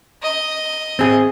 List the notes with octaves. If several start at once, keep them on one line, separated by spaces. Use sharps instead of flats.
D#5
C4 G#4